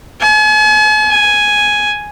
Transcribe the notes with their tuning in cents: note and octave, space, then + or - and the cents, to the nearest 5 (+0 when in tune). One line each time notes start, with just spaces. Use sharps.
G#5 +45
G#5 +5